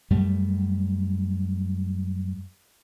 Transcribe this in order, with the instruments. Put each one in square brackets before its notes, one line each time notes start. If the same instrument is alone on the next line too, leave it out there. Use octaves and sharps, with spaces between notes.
[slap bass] F#2 G3 A3